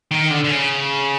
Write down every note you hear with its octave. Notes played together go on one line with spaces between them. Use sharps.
D#3
D3
D3
C#3